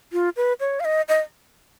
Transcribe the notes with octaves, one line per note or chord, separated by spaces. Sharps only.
F4
B4
C#5
F5
D#5
D#5